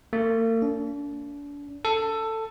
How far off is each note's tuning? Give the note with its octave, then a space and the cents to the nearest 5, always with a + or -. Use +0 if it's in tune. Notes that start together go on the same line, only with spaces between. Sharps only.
A#3 -45
D4 -35
A4 +15